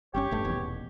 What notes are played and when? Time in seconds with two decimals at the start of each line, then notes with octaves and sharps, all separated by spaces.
0.14 G1 C3 C#4 G4 C#5
0.31 E1 G2 A3
0.45 D#1 E2 B2